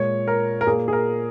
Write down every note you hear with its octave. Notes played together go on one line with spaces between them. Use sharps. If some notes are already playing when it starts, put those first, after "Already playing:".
Already playing: A#2 G#3 C#5
A#4
A#4
A#2 A#3 G#4
G#4
A#4